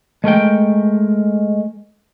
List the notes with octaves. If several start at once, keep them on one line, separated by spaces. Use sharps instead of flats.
G#3 A3 A#4 G5